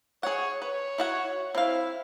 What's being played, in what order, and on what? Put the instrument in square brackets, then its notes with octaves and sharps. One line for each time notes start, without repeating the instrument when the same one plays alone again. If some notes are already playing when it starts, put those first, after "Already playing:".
[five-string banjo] G#4 F#5 [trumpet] C#5
[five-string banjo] B4 [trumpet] C#5
[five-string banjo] E4 F#4 F#5
[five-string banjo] C4 F5 [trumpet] E4